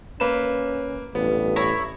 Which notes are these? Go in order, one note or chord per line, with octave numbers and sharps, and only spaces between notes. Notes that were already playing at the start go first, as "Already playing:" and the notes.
A#3 C#4 B4 E7
A1 G2 B3
E4 C#5 A#5